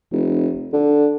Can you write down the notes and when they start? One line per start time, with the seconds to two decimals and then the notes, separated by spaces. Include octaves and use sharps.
0.12 F1
0.73 D3